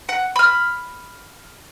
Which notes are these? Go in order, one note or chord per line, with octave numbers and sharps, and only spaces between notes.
F#5
B5 F6